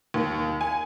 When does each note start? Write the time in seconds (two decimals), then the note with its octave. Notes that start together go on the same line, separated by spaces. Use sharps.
0.14 D#2
0.61 G#5